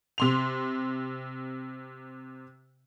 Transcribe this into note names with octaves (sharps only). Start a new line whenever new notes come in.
C3 C6 F7